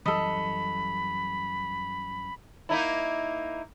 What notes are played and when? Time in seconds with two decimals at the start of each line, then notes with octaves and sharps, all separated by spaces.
0.06 F#2 E3 G3 A4 D#5 B5
2.69 A#3 D#4 E4